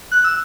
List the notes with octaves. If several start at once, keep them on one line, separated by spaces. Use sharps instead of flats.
F#6
E6